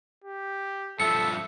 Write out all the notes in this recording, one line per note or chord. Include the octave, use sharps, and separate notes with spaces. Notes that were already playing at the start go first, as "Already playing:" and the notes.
G4
G2 F3 A4 E5 C#7